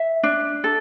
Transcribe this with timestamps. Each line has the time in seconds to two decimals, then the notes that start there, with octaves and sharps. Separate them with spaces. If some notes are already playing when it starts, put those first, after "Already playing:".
Already playing: E5
0.23 D4
0.64 A4